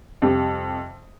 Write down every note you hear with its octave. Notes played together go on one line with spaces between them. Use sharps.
F2 C3 G3